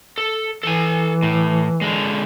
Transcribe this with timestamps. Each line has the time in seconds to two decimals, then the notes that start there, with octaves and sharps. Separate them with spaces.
0.18 A4
0.63 E3 A4 G#5
1.23 A2
1.81 D3 G#3